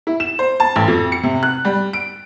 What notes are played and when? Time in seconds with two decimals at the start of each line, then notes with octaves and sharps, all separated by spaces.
0.07 E4
0.20 E7
0.39 C5
0.60 A5
0.76 A1
0.88 F2
1.12 C#7
1.23 C3
1.43 F#6
1.65 G3
1.93 D7